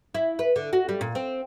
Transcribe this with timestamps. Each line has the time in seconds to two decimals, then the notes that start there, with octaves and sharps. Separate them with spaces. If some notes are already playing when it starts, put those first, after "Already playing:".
0.14 E4
0.39 B4
0.56 D3
0.73 F#4
0.89 G3
1.01 A#2
1.15 C4